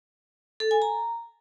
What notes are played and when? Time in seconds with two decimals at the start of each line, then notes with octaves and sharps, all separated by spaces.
0.60 A4
0.71 G#5
0.82 A#5